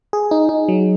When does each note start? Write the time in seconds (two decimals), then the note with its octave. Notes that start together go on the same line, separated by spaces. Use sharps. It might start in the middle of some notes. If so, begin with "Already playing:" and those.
0.13 G#4
0.31 D#4
0.49 D#4
0.69 F#3